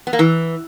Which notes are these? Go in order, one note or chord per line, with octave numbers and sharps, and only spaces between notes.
B3
A#3
E3